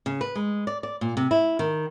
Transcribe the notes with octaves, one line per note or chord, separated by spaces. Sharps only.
C#3
B4
G#3
D5
D5
A#2
C3
E4
D#3